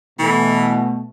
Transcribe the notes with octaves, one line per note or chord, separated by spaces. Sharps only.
B2 E3 A3